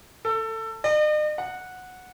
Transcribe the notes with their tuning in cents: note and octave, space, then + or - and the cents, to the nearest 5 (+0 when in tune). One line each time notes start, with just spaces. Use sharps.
A4 +20
D#5 -45
F#5 -10